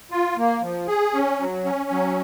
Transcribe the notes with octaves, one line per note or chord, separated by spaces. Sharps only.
F4
A#3
F3
G#4
C#4
F#3
C#4
F#3